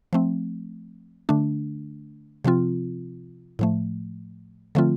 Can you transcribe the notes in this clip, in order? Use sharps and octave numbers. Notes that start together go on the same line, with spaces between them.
F3 A3 C4
D3 A3 D4
C3 F3 C4 F4
A2 F3 A3
D3 F3 A3 C4 F4